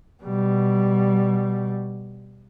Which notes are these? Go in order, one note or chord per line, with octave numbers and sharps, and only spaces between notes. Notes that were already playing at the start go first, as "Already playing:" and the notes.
B2 G3